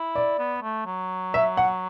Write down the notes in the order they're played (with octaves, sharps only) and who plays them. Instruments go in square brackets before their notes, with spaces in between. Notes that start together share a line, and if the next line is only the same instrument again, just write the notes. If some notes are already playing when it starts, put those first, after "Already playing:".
Already playing: [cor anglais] E4
[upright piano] D5
[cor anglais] B3
A3
F#3
[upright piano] E5
F#5